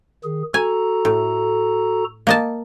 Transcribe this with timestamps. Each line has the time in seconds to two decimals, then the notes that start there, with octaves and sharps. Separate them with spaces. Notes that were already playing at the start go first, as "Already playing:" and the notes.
0.24 D#3 G#4
0.54 F#4 A4 G#5 A#5
1.05 A2
2.27 A#3 D#5 A5